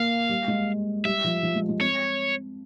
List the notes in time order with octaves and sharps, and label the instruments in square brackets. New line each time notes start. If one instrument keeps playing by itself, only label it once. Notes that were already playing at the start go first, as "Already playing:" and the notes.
Already playing: [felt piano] A#3 [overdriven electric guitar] F5
[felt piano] G3
G#3
[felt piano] G3 [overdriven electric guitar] E5
[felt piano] F3
F3
G#3
G#3
[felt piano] C4 [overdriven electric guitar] C#5